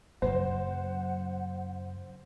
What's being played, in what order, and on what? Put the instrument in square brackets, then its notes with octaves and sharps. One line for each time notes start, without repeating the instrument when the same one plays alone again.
[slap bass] F#2 A#3 [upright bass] C#3 F#3 [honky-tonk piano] C5 [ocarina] F#5